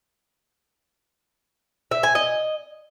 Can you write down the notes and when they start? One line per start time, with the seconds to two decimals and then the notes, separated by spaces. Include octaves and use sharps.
1.91 E5
2.03 G#5
2.15 D#5